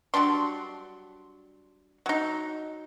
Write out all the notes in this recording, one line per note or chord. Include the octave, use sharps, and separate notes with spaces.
F#3 G3 D4 C6
F#3 D#4